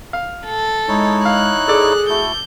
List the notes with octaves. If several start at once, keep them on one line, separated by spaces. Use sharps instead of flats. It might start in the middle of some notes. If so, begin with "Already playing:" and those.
F5
A4
G#3 D#4 E4 C#5
F5 F#6
G#4 A4 D5
A3 E4 F#4 G6